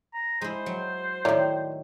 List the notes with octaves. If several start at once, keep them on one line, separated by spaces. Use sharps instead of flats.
A#5
G#3 E4 C5
F#3
A2 D#3 E4 A#4 C#5 D5